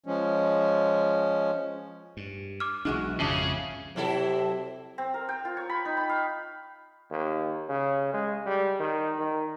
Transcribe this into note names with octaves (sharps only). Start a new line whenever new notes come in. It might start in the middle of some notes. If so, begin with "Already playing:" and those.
F3 G#3 C#4
G2
D6 F6
B1 E3 G#3 D4 F#4 F6
G#1 F2 C#3 E5 A5 D6
C3 F#3 E4 A4
C4
A#4
G5
F4
C#5
B5
D#4
B5
F5
D#2
C#3
G#3
G3
D#3
D#3